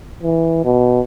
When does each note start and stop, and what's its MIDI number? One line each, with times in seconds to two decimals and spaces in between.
0.23 0.63 52
0.64 1.01 47